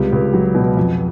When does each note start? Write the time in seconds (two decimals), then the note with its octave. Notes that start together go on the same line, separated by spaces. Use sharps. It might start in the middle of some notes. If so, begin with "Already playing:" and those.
Already playing: C#2 C3 G3 G4
0.13 C#2
0.33 F#3
0.55 B2
0.77 F2